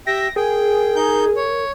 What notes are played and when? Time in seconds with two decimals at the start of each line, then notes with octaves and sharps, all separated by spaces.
0.07 G4 E5 G5 A#6
0.36 G#4 A#4 G5
0.96 D#4 G6
1.36 C#5